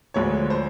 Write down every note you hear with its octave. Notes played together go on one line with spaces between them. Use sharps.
D2 D3 F3 G#3 C#5
C5